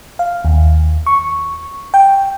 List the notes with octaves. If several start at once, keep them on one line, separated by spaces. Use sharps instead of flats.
F5
D#2
C#6
G5